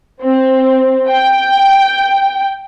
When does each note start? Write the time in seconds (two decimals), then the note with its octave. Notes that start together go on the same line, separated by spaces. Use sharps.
0.23 C4
1.09 G5